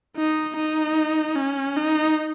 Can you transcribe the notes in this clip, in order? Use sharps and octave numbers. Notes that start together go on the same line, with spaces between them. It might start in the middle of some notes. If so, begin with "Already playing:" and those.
D#4
D#4
C#4
D#4